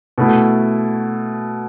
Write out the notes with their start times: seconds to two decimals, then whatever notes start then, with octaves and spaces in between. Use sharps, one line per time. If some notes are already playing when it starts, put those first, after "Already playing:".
0.18 B2 A3 E4